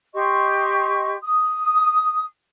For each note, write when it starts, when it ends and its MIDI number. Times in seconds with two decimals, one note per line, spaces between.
0.13 1.15 67
0.13 1.15 75
0.13 1.15 84
0.13 1.15 85
1.20 2.23 87